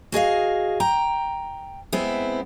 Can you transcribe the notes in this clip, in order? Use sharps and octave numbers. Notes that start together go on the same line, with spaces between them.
F#4 G#4 D#5 F5
G5 A#5
G#3 B3 C4 E4